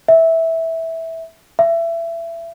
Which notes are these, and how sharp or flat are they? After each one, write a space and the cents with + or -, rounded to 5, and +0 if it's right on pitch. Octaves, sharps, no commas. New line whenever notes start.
E5 -10
E5 +25